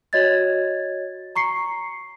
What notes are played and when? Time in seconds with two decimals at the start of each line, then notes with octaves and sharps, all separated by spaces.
0.13 F#4 C#5 D#5 G#6 A6
1.36 A#5 C#6 C7 C#7